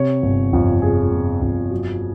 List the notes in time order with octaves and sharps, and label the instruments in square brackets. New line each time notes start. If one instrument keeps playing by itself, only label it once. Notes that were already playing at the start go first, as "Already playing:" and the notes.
Already playing: [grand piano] C3 C#5
G1
F2
C3 G#4
G1
F2
F#3